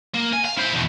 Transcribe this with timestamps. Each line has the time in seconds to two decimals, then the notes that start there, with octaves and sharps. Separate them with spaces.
0.14 A#3
0.33 G#5
0.45 F5
0.58 E4 C5
0.73 E2 B2